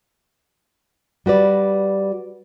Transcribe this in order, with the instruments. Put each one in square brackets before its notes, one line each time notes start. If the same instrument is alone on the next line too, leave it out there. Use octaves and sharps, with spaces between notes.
[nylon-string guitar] G3 F#4 B4 D5